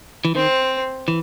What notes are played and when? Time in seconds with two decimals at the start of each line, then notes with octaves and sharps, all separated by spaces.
0.25 E3
0.35 D#3 C4
1.08 E3